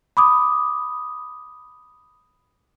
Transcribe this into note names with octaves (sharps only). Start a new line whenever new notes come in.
B5 D6 D#6